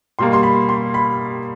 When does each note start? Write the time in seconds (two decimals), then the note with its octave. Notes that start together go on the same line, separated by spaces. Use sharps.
0.19 B2 G3 A#3 C6
0.33 C6
0.43 B5
0.69 C6
0.94 B5